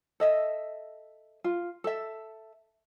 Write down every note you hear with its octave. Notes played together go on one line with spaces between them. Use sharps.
A4 D#5 E5
F4
A4 E5